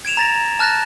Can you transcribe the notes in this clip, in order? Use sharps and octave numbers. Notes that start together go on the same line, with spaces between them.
G#6 D7 E7 F7
A#5 A6 A#6
A5 F6 F#6 A6 A#6